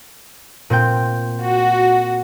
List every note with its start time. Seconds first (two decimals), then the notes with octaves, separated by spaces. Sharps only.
0.70 A#2 C4 G5
1.40 F#4